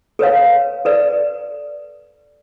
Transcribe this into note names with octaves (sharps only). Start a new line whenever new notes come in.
A4 B4 C#5 F5
A4 B4 D5